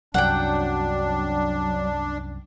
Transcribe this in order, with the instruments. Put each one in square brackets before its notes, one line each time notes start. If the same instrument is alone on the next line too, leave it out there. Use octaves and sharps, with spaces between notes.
[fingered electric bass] C2 F#2 [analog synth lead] F#3 [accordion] D4 [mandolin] F#5 G5